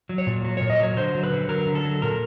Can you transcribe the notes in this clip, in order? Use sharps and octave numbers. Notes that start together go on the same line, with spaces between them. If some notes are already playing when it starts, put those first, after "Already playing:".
F#3
C#5
A#2
F#3
A#2 C#5
D#5
F#3 C#5
D3 C5
F#3
B4
D3
F#3 A#4
D3
A4
F#3
A#2 A#4